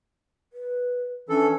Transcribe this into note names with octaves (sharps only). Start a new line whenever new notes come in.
B4
E3 C#4 D4 A4